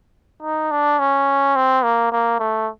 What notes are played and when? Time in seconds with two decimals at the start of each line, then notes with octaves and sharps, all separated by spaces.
0.42 D#4
0.71 D4
0.99 C#4
1.56 C4
1.84 A#3
2.12 A#3
2.39 A3